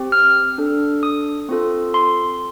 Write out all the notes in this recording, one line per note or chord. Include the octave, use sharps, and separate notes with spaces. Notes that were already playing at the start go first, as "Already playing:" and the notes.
Already playing: C4 G4
F6
D4 A4
D#6
C4 F4 A4
C6